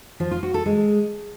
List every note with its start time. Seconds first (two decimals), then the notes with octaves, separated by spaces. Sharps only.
0.20 F3
0.31 F4
0.43 F#4
0.54 A4
0.66 G#3